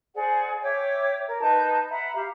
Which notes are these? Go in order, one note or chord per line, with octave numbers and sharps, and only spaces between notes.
G#4 C5 D5 F#5
C#5 E5 G5 D6
A#4
D#4 B4 A5 G6
E5 F#5 A#5 B5
G4 F5